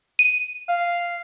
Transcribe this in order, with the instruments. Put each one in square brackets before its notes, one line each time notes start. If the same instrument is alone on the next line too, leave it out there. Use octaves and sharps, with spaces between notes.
[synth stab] D#7
[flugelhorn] F5